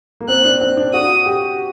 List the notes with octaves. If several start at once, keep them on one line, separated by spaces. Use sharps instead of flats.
A#3
C4 F#6
D4
C4
D4
F#4 D#6
G4